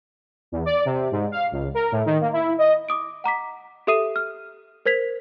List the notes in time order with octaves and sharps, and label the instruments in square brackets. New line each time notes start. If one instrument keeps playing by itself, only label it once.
[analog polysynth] E2
D5
C3
G#2
F5
C#2
A#4
A2
D#3
A#3
E4
D#5
[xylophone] D6 D#6 D7
F#5 A#5 D6 B6
G4 A4 E5 D#6 C7 D#7
F6
A#4 C5 G#6 B6 F7